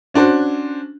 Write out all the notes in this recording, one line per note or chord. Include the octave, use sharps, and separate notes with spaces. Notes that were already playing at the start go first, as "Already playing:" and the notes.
C#4 D4 F#4 C5